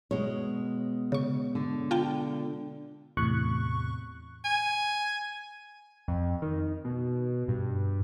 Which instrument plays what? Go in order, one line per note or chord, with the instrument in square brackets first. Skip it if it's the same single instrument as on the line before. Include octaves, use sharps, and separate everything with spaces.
[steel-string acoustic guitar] B2 G#3 [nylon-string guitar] C#5
[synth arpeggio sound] C#3 C#6
[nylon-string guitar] D3
[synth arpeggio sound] F4 G5 A5
[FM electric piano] E2 A2 C3 C#6 F#6
[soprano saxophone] G#5
[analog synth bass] F2
D#3
B2
G2